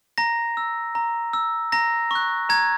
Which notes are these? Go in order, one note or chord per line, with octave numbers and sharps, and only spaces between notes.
A#5 A#6
E6
A#5
E6
A#5 A#6
C#6 F#6
A#5 G#6